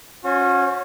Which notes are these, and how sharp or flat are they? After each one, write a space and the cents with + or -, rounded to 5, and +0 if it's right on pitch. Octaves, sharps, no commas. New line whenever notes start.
C#4 +0 F#4 -35 C5 +25